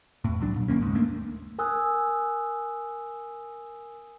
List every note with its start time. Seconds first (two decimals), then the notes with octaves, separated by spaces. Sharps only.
0.24 E2 A2
0.40 D#1 C2 F#3 D4
0.56 A#2
0.68 G1 D#2 A#3 C#4
0.81 C#2 G#2
0.95 D#2 A3 A#3 D4
1.58 A#4 G#5 D#6 E6 F#6